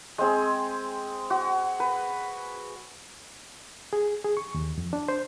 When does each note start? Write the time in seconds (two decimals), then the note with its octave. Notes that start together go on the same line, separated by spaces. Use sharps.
0.18 G#3 C4 G#4
1.30 F#4
1.80 B4
3.93 G#4
4.24 G#4
4.37 C#6
4.54 D#2
4.78 F2
4.93 D4
5.08 C5